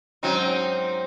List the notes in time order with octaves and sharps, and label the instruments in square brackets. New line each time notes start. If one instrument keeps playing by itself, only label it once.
[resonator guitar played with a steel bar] G#2 F#3 C#4 [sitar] C4 D#4